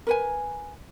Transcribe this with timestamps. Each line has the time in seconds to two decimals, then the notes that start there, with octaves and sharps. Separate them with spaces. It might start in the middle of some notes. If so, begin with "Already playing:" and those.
0.07 A#4 B4 G#5